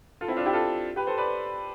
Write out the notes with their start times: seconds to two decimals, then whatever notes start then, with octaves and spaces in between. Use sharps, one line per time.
0.21 F4 A4
0.28 C4 E4
0.37 D4 F4
0.46 E4 G4
0.53 F4 A4
0.96 G4 B4
1.07 A4 C5
1.18 B4 D5